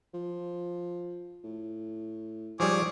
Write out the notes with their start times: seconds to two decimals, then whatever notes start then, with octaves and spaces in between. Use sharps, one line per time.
0.14 F3
1.44 A2
2.60 G#2 F3 G3 G#4 C#5 D6